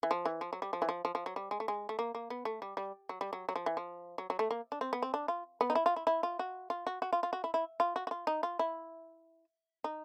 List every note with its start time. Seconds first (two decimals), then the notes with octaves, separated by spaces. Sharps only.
0.03 E3
0.11 F3
0.25 E3
0.41 F3
0.53 F#3
0.62 G3
0.73 F3
0.82 E3
0.89 F3
1.05 F3
1.15 F3
1.26 F#3
1.36 G3
1.51 G#3
1.60 A3
1.68 G#3
1.89 A3
1.99 A#3
2.15 A#3
2.30 B3
2.45 A3
2.62 G3
2.77 G3
3.09 F#3
3.21 G3
3.33 F#3
3.49 F#3
3.56 F3
3.66 E3
3.77 F3
4.18 F#3
4.30 F#3
4.39 A3
4.51 A#3
4.72 D4
4.81 C4
4.93 B3
5.02 C4
5.14 D4
5.28 F4
5.61 B3
5.70 D#4
5.75 E4
5.86 F4
5.96 E4
6.07 E4
6.23 F4
6.39 F#4
6.70 F4
6.87 F#4
7.02 F#4
7.13 F4
7.23 F4
7.33 F#4
7.44 E4
7.54 E4
7.80 F4
7.96 F#4
8.07 F#4
8.11 F4
8.27 D#4
8.43 F4
8.59 E4
9.84 D#4